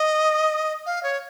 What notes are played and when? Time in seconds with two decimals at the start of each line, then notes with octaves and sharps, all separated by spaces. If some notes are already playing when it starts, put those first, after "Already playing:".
Already playing: D#5
0.86 F5
1.03 C#5